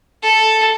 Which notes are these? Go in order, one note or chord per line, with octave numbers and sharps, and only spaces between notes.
A4